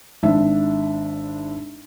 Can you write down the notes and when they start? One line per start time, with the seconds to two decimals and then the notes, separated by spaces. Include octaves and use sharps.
0.23 G#1 D4 E5